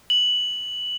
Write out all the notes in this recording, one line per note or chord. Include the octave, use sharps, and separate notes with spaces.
F#7